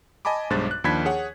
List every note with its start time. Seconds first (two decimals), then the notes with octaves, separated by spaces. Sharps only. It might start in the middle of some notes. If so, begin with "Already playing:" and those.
0.25 D#5 G#5 A5 B5 D6
0.50 B1 G2 G#3 C5 F#6 A6
0.71 F#6
0.84 D#2 F3 D4 B5 G#6 B6
1.05 G#4 C#5 F#5